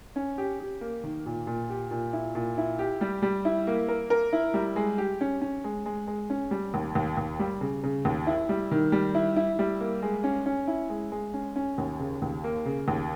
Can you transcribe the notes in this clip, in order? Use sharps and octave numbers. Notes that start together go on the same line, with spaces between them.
C#4
G4
G4
A#3
D#3
A#2
A#2
G4
A#2
E4
A#2
E4
G4
G3
G3
E4
A#3
A#4
A#4
E4
G3
G#3
G4
C#4
C#4
G#3
G#3
G#3
C#4
G3
D#2
D#2
D#2
G3
C#3
C#3
D#2
E4
G3
D#3
G3
E4
E4
G3
A#3
G#3
C#4
C#4
E4
G#3
G#3
C#4
C#4
D#2
C#3
D#2
A#3
C#3
D#2